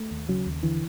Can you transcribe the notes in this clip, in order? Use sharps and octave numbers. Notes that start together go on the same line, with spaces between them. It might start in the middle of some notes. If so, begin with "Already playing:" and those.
Already playing: A3
D#2
C#3 F#3
D#2
D3 E3